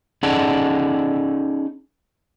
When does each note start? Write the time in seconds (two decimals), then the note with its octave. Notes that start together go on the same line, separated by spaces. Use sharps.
0.23 C#4 D#4 G#4 A4 D5 F#5